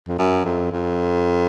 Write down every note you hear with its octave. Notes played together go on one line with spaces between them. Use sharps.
F2
F#2
F2
F2